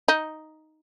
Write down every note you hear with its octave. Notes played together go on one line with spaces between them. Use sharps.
D#4